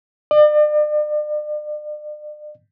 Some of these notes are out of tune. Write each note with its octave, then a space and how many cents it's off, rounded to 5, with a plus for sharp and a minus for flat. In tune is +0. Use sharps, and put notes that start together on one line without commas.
D5 +40